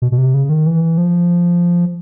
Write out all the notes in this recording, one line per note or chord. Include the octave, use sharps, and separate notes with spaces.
B2
B2
C3
C#3
D#3
E3
F3